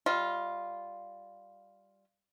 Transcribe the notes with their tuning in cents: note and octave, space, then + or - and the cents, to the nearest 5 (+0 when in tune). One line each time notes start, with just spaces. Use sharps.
G3 +0 F4 +0 D#5 +35